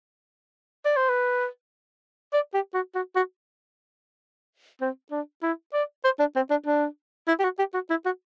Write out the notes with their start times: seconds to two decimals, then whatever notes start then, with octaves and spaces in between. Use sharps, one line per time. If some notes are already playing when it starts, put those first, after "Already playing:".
0.85 D5
0.97 C5
1.09 B4
2.33 D5
2.54 G4
2.74 F#4
2.95 F#4
3.16 F#4
4.81 C4
5.11 D4
5.43 E4
5.73 D5
6.05 C5
6.19 D4
6.36 C4
6.50 D4
6.66 D4
7.28 E4
7.39 G4
7.44 F#4
7.59 G4
7.74 F#4
7.90 E4
8.05 F#4